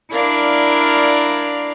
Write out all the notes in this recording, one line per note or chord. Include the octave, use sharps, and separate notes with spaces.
D4 E4 A#4 D5 F5